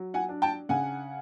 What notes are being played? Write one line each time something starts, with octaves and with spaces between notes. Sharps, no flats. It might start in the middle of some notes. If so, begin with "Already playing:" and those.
Already playing: F#3
F#5 G#5
D4
G5 A5
C#3 F#5 G#5